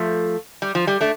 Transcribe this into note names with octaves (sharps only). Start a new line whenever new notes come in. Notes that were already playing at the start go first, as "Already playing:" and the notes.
Already playing: F3 A3
G3
F3
G3
A3 D4